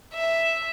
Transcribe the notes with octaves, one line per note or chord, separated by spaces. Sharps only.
E5